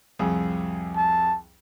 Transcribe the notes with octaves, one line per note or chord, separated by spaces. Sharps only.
C2 F2 G#4
A5